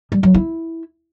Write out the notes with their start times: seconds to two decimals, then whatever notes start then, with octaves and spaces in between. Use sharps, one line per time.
0.12 G3
0.23 F#3
0.34 E4